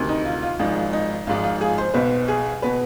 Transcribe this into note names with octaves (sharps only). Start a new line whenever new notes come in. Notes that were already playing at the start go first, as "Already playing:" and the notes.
Already playing: D2 C3 D#3
D#4
F4
F4
G#1 G#2 F3 D#4
D#4
G#1 G#2 F3 F4
F4
G#4
C5
B1 B2 B4
G#4
B2 B4